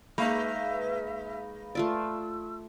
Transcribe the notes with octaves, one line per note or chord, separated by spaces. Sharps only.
G#3 A#3 D#4 B4 E5 F5 B5
A3 F4 D5 E6